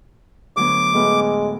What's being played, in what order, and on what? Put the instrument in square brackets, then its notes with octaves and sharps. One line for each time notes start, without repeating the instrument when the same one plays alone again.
[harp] D2 F#3 B3 [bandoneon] D6
[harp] A2 B3 F6 [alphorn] G#3